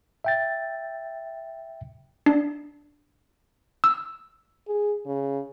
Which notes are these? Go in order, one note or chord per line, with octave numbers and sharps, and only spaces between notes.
E5 G5 A6
D4
E6
G#4
C#3